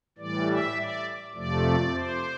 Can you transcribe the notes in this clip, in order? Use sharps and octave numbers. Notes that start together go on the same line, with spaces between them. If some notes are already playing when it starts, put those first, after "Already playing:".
A2 E3 G3 D5
E5
D5
F2 C3 F3 A3 D5
C5